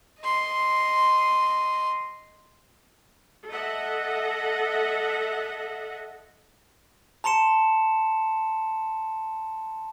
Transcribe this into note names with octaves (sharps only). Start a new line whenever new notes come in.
D#5 C6
A4 D#5 E5 F#5
A5 A#5 C6 C#7 E7